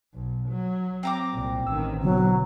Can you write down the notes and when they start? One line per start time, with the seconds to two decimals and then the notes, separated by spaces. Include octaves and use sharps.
0.15 B1
0.49 F#3
1.03 C4 A#5 D6
1.32 C2 A#2
1.67 A1 D#3 E6
2.03 B2 D3 F#3 B3